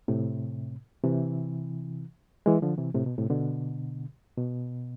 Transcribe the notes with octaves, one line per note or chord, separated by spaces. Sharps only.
A2 C3
C3 E3
E3 G#3
D3 F3
C3 E3
A2 C3
B2
A2 C3
B2 D3
B2